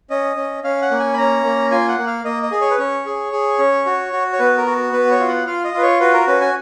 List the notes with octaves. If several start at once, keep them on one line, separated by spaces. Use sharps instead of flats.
C#4 D#5
C#4
C#4 F5
F#5
A#3
G#5
B5
C#4 A#5
A#3
F4 G#5
F#5
A#3
F5
A#3 D#5
D#5
G#4
C#5
B4
C#4 C#5
G#4
G#4
C#4
F#4
F#4
C#5
B3 B4
A#4
F#4
B3 B4
C#5
F4
F#5
F4 F5
D#5
F4 B4
C#5
F#4 B4
A#4
C#4 B4
G#5